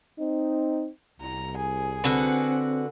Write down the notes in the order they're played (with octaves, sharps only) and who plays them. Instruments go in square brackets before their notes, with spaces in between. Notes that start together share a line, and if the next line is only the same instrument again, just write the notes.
[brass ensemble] C4 D#4
[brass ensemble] C2 [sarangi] A#5
[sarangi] G#4
[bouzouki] D3 F#4 B4 [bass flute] C4